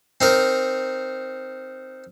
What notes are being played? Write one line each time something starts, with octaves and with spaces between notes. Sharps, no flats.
C4 D#4 A#4